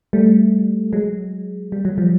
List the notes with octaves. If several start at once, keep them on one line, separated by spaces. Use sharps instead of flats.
G3 A3
F#3 G#3
G3
F#3
F3 G3